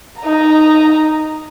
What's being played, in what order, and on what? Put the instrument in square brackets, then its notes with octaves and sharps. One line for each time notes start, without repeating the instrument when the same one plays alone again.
[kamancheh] D#4 A#5